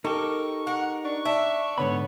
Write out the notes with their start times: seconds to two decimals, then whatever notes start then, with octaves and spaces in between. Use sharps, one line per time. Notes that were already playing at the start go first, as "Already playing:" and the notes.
0.05 D#4 G4 A4 A#4 C#6
0.67 A#4 F#5
1.05 D4 C#6
1.25 D4 E5
1.78 G#2 D3 B3 C#5 B5